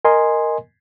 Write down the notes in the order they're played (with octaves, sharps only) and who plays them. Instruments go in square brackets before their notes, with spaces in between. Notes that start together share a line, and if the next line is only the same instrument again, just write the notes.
[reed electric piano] A#4 D#5 G#5 C6